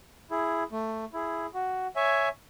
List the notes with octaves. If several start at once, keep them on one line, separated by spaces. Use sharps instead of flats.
E4 G#4
A3
E4 G#4
F#4
C#5 E5 G#5